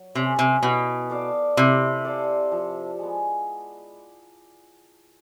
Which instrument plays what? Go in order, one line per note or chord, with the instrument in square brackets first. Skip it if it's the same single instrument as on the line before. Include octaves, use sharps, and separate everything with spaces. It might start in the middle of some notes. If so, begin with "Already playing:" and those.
Already playing: [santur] F#3
[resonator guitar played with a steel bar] C3 [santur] A3 C#4
[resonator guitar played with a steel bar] C3
[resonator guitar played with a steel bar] B2 [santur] E4
[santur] A4 D5 F5
[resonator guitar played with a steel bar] C3 [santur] E4
[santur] A4 D5 F5
F3
G#3 B3